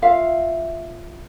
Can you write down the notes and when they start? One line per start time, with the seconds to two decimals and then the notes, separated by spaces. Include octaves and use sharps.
0.02 F4 E5 F5